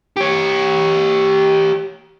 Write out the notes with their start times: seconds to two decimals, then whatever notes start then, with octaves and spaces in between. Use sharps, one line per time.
0.17 G4 C#5